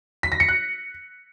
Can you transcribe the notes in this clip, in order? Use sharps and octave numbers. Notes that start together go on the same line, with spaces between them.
B6
A#6
C#7
F#6